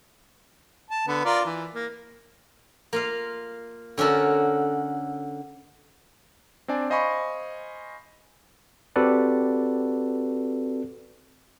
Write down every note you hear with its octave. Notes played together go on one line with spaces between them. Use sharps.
A5
D3 B3
F4 A#4 D5
E3
A#3
A#3 F4 F5
D3 C#4 F#4 A4 A#4
C4 D4 D5 G#5
C5 D#5 F5 G#5 B5 C#6
C4 F#4 G4 A4 B4 D5